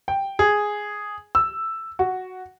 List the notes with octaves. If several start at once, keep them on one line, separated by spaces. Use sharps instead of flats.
G5
G#4
E6
F#4